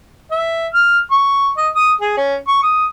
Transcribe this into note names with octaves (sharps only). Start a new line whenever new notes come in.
E5
F6
C#6
D#5
D#6
G#4
C#4
C#6
D#6